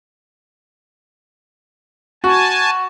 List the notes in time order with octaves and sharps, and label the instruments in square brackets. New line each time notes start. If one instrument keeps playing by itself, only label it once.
[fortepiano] F#4 [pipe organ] G#5 A5